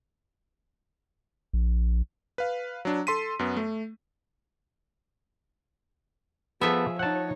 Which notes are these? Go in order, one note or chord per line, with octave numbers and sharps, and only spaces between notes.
A#1
B4 F5
F#3 D4
A4 C6 B6 D#7
F#2 B3
A3
F3 B3 G#4 A4 E5
D#4 C#5 F#5 A5